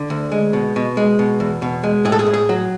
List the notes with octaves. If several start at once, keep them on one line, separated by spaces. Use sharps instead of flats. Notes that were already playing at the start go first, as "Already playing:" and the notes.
Already playing: D3
D2
G#3
B2
B2
G#3
B2
E2
B2
G#3
A2 G#4
A4
G#4
A2
G#4
F#3